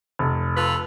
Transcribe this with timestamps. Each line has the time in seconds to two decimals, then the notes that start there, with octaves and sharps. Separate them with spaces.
0.19 F1
0.57 F4 A4 B4